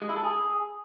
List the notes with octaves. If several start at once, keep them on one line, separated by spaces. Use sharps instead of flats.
G#3
E4
A4
G#4